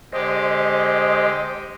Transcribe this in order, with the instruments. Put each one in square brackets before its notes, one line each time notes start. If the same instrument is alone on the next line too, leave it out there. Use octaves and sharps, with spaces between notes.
[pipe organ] D3 G#3 G4 [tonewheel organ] C5 D#5